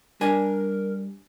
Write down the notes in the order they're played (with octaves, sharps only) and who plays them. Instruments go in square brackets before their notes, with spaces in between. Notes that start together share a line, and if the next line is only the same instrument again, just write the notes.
[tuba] G3 [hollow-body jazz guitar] D4 G#5 [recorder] A#4